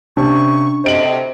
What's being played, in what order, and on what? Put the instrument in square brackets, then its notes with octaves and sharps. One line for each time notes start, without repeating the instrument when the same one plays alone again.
[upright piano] C3 [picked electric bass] C#4 D4 [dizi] C#6
[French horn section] D2 C3 [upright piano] C5 D7 F#7 [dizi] D#5